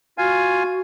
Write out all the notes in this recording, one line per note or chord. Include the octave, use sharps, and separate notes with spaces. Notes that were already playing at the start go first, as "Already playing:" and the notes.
F4 F#4 F5 G#5